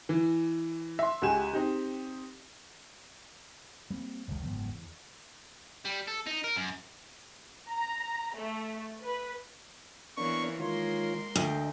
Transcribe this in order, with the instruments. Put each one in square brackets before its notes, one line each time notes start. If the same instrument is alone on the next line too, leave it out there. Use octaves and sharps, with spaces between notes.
[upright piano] E3
E5 C6
C#2 F#4 G4 G#5 E7
C4 D#4 G4
[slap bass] G3 A#3 C4
F1 C#2 D#3 G#3
F#1 G#2 F3 B3
E2
[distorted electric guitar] G3
A4
D#4
A#4
F#2
[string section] A#5
A3
B4
[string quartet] E3 A#3 C#5 [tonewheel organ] B3 D4 [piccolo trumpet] C#6
[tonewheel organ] D#3 F4 C#5 [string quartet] G#3 A#3 A#4 [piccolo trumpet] C6
[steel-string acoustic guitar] D2 [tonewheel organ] D#5 G5